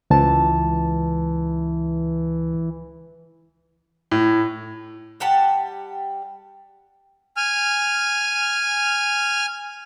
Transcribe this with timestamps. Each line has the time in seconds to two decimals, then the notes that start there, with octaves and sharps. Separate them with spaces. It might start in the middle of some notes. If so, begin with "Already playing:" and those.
0.10 C#2 E3 A5
4.11 A2
5.20 G3 G4 F#5 A5
7.37 G#5 F6